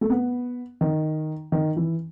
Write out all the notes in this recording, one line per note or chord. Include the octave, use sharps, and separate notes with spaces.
A3
B3
D#3
D#3
E3